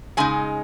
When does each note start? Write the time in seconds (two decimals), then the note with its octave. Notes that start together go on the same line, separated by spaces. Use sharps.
0.17 C#3 G#3 D#4 G#5